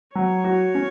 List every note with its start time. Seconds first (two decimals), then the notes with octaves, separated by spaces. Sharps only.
0.15 F#3 C#5
0.44 F#4
0.75 C#4